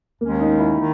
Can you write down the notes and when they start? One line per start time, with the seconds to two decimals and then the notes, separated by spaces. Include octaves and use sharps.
0.21 D#2 D#3 G#3 A#3 C#4
0.41 D#4
0.59 E4
0.78 D#3